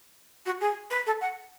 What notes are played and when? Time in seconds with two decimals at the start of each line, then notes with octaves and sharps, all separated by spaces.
0.46 F#4
0.61 G#4
0.91 B4
1.06 A4
1.21 F#5